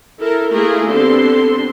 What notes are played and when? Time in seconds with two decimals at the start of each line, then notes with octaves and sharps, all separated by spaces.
0.19 E4 A4 A#4
0.52 A3 A#3 E4 F4 G#4 A#4
0.90 D3 B3 C4 G4 A4 C6